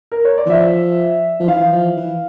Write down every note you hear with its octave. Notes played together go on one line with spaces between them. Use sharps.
A#4
C#5
D5
E3
F3 E5
F3
E3 F5
F3
E3